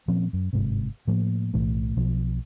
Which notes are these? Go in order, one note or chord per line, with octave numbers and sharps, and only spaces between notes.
A#2 F3 C4 C#4
F#2
G1 G#2 C3
A2 F3 A#3
B1 A2 E3 A3
B1 B2 F3